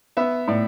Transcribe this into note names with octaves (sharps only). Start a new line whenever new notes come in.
B3 E5
A2 D5